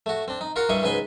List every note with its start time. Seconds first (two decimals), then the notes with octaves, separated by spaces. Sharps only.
0.06 A3 F#4
0.28 C4 D4
0.41 D#4
0.56 F4 F#4 A#4 F5 F#5
0.69 G2 G3 E4 D#5 F5 C#6
0.83 C#2 G#2 B4 G#5 B5 C6